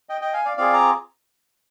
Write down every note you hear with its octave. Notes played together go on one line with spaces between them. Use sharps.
D#5 G5
D#5 G5
F5 G#5
D5 F5
C4 F4 G#4 D5 F5
A#5 D6